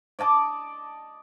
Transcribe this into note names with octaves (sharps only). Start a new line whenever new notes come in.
D5 D#5 A5 D6